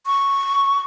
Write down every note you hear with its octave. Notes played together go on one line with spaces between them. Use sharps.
C#6